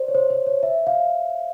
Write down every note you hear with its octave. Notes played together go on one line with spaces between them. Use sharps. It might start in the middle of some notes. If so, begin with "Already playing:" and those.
Already playing: C5 D5
C#5
C5
C5
C#5
E5
F5